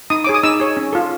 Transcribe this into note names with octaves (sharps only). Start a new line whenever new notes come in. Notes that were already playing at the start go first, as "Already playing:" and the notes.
D#4 D#6
G#4 C#5 D6
D#6
D#4 E6
G#4 C#5
C#4
F4 A4